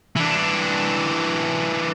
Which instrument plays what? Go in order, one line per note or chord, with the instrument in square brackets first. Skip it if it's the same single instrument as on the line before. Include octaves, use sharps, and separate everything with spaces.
[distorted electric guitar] E3 D4